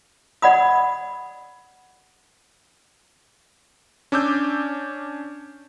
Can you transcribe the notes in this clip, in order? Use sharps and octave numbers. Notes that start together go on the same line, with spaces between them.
D5 F#5 B5 D#6
C#4 D4 D6 E6 G6